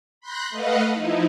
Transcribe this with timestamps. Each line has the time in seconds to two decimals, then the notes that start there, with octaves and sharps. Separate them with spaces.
0.21 B5 C6 F#6 G6 A#6
0.50 A3 B4 D#5 F5 F#5
0.92 F3 D#4 E4